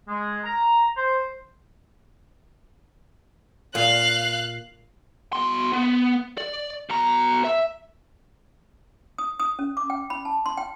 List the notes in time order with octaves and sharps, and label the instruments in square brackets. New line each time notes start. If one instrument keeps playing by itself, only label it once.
[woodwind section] G#3
A#5
C5
[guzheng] A#2 [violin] F5 F#6
[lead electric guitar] B2 C6
B3
D5
B2 A#5
E5
[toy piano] D#6
D#6
C#4
D6
G5
B5
A5
C6
G5